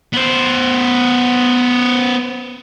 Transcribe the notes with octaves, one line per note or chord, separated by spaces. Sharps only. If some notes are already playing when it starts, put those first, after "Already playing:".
B3 C5